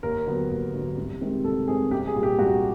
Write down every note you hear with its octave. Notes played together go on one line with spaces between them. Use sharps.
D#2 A#4
D3 F#3 B3
D#2
D3 F#3 B3
C2
C3 D#3 G#3 C4
C2 A4
C3 D#3 G#3 C4 G#4
C2 G4
G#4
A#2 G3
G4
C2 F#4